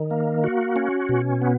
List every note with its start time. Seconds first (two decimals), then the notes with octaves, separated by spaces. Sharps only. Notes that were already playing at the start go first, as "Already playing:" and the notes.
Already playing: D#3
0.11 A#3
0.44 F#4
0.76 C#4
1.09 B2
1.42 B3